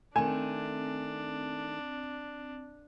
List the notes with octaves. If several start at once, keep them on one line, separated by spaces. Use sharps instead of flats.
D#3 A3 C4 D4 G#5